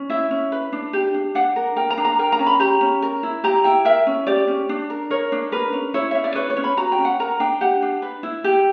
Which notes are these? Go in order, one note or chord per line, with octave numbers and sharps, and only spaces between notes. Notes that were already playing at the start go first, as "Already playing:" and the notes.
Already playing: C#4
E4 E5
C#4
B4
D4
G4
D4
D4 F#5
A#4
A#4 G5
A#5
D4
A#5
A#4 G5
A#5
C#4
B5
G4 A#5
C#4
A#4
E4
G4 A#5
E4 G5
A#4 E5
C#4
G4 D5
C#4
D4
A#4
A#4 C#5
D4
A#4 B4
C#4
E4 C#5
C#4 E5
D5
B4 C#5
C#5
C#4
B5
F#4 A#5
G5
C#4
F#5
A#4 A#5
D4 G5
G4 F#5
D4
B4
E4
G4 G5